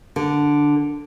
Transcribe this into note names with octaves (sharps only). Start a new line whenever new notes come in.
D3